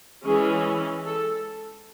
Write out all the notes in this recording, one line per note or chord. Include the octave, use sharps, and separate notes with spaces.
E3 G#3 C#4 G#4
A4